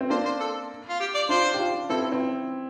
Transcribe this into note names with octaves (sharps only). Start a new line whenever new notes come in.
C4
A#3 D4 C5
C5
A4
F4
G4
D5
D4 F4 C5
G4
D4 F4
C4 E4 A4
C4